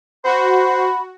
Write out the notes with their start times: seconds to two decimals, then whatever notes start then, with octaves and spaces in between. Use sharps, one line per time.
0.24 F#4 C5 B5